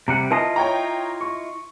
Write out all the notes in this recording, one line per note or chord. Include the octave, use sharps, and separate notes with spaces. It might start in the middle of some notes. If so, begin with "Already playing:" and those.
C3 G3 F#5 A#5
E4 F4 B4 D#5 A5
C#5 G5 A#5
C#6